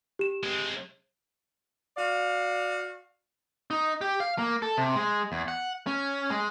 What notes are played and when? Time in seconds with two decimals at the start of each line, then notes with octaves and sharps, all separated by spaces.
0.19 G4 E7
0.43 G#3 C4
1.97 F#4 D5 F5
3.71 D#4
4.01 G4
4.20 F5
4.38 A#3
4.62 A4
4.77 C3
4.96 G#3
5.32 E2
5.48 F#5
5.87 C#4
6.30 G#3